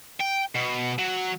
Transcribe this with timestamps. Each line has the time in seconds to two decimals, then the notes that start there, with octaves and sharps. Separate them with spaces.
0.20 G5
0.55 B2
0.98 F#3